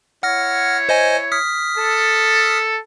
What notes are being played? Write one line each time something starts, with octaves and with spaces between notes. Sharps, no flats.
E4 C#5 F#5 F6 A#6
C5 D#5 G#5
D#6 F6 B6
A4